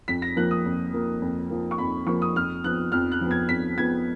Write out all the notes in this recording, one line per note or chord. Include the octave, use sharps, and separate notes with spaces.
F2 B6
A#6
F3 A#3 F#6
D#6
F2
F3 A#3
F2
F3 A#3
C#6
F2 B5
F3 A#3 C#6
D#6
F2 F6
F3 B3 F#6
F2 F6
F#6
F3 B3
G#6
F2 B6
F3 B3 G#6